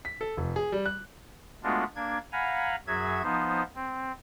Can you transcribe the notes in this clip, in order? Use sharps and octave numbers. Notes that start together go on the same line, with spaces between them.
B6
A4
F1
G#4
G3
F#6
G#3 A3 B3 D4 F4 F#4
A#3 D4 G#6
F5 F#5 G#5 A#5 B5
F#2 F#3 F#4 G#4 E5 G#6
F3 B3 D#4 C5
C4